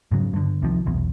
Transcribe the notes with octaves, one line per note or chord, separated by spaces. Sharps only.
G#2 C#3 F#3
G2 D3
C2 C3 D#3 F3
F1 B1 E2